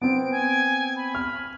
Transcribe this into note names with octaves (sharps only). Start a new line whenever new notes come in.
B3 C4 D7
G#5
B5
F6